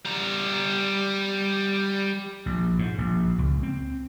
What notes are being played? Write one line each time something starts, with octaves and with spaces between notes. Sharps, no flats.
G3 A#5
A#1
G#2
A#1
C#2
C4